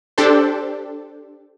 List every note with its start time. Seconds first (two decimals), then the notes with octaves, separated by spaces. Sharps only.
0.18 D4 G4 A4 C5